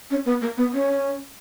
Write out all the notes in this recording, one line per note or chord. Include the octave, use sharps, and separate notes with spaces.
C#4
B3
A#3
B3
C#4